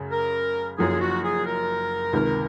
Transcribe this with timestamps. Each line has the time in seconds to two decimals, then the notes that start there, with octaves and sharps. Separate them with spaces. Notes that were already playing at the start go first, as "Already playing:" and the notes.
Already playing: F#2 C#3
0.12 A#4
0.78 F#1 F#2 F3 G#4
1.01 F#4
1.24 G#4
1.46 A#4
2.13 C#2 C3 D#3